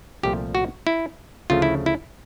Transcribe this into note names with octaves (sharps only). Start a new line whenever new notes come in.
C2 A#2 F3 A3 G4
F#4
E4
D2 C#3 F3 A3 F4
E4
E4